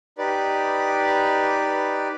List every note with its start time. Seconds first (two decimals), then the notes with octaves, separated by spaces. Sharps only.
0.18 D#4 G4 B4 D5